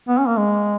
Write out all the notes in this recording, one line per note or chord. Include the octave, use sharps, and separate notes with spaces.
B3
C#4
A#3
G#3